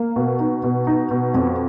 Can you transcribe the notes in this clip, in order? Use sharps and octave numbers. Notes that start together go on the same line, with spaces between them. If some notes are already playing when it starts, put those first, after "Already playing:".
Already playing: A#3
B2
D#4
B2
D#4
B2
F2